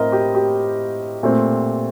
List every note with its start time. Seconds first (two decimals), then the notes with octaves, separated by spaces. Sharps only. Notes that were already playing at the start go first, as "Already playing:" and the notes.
Already playing: A2 C4 A#4 D#5
0.12 G4
0.35 G4
1.23 A#2 A3 C4